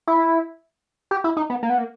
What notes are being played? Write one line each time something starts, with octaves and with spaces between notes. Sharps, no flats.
E4
G4
E4
D#4
B3
A#3
B3
A#3